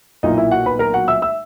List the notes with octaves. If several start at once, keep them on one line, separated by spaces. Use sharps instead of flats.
B1 A#2 A#3 D#4 E4 D#5
E4 E5
F#4 F#5
B4 B5
A#4 A#5
F#4 F#5
E5 E6
E5 E6